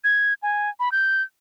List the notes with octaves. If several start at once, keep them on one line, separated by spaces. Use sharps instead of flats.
G#6
G#5
B5
G6